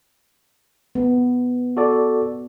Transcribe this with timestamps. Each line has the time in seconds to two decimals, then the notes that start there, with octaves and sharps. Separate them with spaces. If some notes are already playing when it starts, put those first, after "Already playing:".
0.95 B3
1.77 F#4 A4 D5